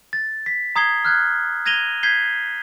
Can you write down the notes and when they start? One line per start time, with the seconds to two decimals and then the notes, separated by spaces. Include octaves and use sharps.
0.13 A6
0.46 B6
0.76 A#5 D#6 G#6 C7 G7
1.05 F6 F#6 G#6
1.66 G#6 A#6 D#7 F7 G7
2.03 G6 G#6 B6 C7 G7